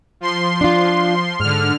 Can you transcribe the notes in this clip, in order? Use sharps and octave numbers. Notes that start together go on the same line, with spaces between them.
F3 C6
D4 F4
G#2 D3 F6